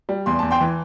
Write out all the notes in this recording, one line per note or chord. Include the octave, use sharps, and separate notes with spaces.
G3
E2 C6
E2 A5
G5 C6
E3